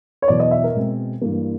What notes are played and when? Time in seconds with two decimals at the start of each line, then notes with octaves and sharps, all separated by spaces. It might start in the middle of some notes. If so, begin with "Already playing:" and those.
0.22 C#5
0.28 E2 B2 F#3 B3 D5
0.40 D#5
0.51 E5
0.64 A#4
0.75 B2 G#3 C4
1.22 G2 E3 G3 A#3